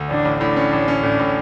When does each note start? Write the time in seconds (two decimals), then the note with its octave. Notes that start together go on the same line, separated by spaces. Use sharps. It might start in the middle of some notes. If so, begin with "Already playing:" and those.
Already playing: D2
0.10 A1 D4
0.25 A1
0.41 A2 D4
0.56 C#4
0.73 A1
0.88 C#4
1.03 A2 D4
1.19 A2